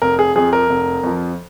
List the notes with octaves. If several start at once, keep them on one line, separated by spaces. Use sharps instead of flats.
F1 A#4
G#4
F2 F3 G#4
A#4
F1
F2 F3